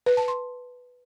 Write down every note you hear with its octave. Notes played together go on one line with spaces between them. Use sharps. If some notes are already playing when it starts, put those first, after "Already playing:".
B4
A5
C6